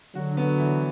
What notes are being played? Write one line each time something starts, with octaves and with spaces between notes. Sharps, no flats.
D3 F#3 F#4
B3
E3